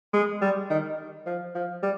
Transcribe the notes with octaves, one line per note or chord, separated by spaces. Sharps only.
G#3
G3
D#3
F3
F3
G3